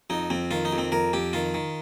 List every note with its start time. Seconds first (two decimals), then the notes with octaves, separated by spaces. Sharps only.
0.10 F2 D#4
0.30 F2 C4
0.51 D#3 F4
0.65 D#4
0.73 F2
0.78 C4
0.92 F2 A#4
1.13 F2 G4
1.33 D#3 F4
1.54 D#3